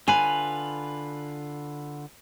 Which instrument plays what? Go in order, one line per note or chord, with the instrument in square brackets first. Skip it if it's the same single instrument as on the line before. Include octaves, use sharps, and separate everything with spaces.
[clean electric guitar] D3 F4 B4 [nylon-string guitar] G#5